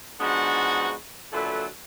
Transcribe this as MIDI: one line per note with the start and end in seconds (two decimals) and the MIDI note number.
0.20 0.94 53
0.20 0.94 56
0.20 0.94 59
0.20 0.94 62
0.20 0.94 63
0.20 0.94 66
1.32 1.66 46
1.32 1.66 50
1.32 1.66 54
1.32 1.66 69
1.32 1.66 71
1.32 1.66 76